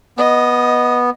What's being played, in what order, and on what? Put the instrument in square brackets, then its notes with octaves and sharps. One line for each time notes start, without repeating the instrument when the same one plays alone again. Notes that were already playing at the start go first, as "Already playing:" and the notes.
[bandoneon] B3 [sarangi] D#5